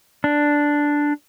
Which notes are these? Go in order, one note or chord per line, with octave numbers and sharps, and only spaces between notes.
D4